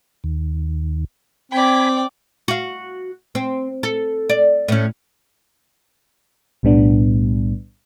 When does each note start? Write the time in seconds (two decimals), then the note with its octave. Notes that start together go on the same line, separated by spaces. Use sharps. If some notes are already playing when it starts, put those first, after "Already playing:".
0.24 D#2
1.52 C4 D5 G5 G#5 B5
2.48 F#4 F5
3.35 C4
3.83 A4
4.29 D5
4.68 A2 C#4
6.63 B1 A2 G3 B3 D4